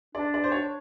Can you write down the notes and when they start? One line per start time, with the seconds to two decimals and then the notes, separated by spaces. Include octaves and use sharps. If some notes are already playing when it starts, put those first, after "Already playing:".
0.15 D4 D5
0.34 D5
0.44 C5
0.52 C#5